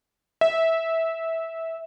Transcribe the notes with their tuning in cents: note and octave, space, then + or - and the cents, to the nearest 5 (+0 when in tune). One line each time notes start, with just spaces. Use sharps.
E5 -15